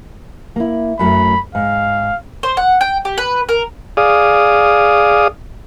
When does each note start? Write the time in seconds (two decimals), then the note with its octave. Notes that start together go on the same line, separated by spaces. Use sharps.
0.56 A#3 E4
0.99 F#2 F#3 A3 B5
1.55 G#2 F5
2.43 C5
2.57 F#5
2.81 G5
3.05 G4
3.18 B4
3.49 A#4
3.97 G#4 D5 F5 D#6